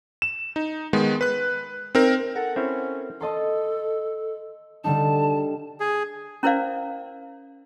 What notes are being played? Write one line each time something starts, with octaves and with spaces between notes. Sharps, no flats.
E7
D#4
D#3 G#3 B3
B4 F#6
C4 D#4 A#4
A4 A#4 F#5
C4 C#4 E4 C#5
A4 D#5 A5 C6
D3 G3 D#4 A5
G#4
C#4 E4 A#4 C5 D5 F5